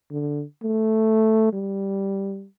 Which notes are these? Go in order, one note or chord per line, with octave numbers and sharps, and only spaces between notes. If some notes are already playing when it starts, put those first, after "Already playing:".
D3
A3
G3